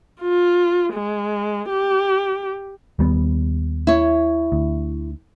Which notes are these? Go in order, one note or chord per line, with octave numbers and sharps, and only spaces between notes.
F4
G#3
G4
D#2 G3 B3
E4 C#5
D2